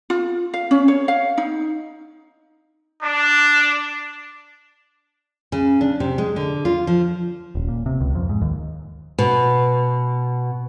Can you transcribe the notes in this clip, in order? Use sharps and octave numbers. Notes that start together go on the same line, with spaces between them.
F4
F5
C#4
C#5
F5
D#4
D4
C#3
D4
C3
G#3
D3
F4
F3
D#1
A#2
C3
C#2
F2
G#2
D#2
B2